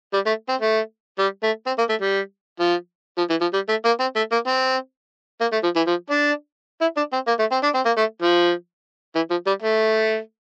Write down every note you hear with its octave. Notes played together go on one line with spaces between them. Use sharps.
G3
A3
C4
A3
G3
A3
C4
A#3
A3
G3
F3
F3
E3
F3
G3
A3
A#3
C4
A3
A#3
C4
A#3
A3
F3
E3
F3
D4
E4
D4
C4
A#3
A3
C4
D4
C4
A#3
A3
F3
E3
F3
G3
A3